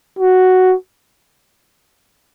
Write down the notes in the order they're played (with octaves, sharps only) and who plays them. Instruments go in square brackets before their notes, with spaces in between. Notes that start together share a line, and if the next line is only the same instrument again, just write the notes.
[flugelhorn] F#4